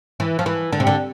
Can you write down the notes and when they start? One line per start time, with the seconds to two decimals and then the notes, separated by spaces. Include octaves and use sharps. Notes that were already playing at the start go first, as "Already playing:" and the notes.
0.20 E3
0.39 F3
0.46 E3
0.72 D3
0.80 C3
0.87 D3